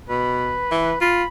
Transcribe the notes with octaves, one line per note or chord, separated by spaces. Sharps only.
B2 B4
E3
F4 B5